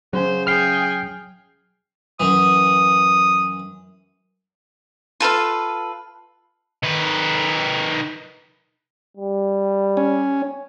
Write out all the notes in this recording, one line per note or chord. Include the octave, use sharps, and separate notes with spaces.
C#3 F#3 C#4 C5
G#4 G5 F6 C7
F#2 E3 D#6
F4 A4 B4 F5
D#3 B4
G3
C#4